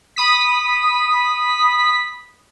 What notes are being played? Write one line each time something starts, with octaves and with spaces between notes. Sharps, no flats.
B5 D#6 B6